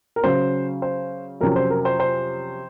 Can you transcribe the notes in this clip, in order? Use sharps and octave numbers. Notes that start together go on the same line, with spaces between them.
A#4
C#3 F#3 C#4 C5
C5
F2 C3 F#3 C#4 A#4
C5
A#4
C5
C5